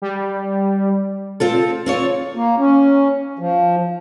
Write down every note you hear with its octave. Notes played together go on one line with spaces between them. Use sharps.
G3
C4 F4 A4
C4 F4 C#5
A#3
C#4
F3